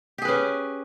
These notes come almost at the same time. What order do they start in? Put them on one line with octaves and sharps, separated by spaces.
G4 G#4 B4 C#4